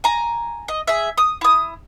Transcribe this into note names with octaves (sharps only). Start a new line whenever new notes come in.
G#5 A#5
D#5
G#4 E5
D#6
E4 D#6